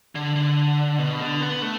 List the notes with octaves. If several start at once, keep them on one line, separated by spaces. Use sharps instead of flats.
D3
D3
B2
D3
B3
A3